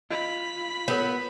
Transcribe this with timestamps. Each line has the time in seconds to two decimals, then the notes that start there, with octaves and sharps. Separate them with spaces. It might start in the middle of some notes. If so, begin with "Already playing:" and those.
0.10 F4 D#5 B5
0.88 B3 A4 A#4 C#5